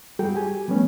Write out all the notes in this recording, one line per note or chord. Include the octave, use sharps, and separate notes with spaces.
G3 F#4 G#4 A4 G5
G4 G#5
F3 G3 A3 B3 C#4